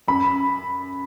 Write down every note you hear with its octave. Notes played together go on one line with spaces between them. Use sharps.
F#2 B5